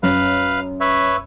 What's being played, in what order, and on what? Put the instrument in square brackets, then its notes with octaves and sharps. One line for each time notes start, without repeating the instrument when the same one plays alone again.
[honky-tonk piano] F#2 [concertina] B4 F5
[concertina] B4 C#5 E5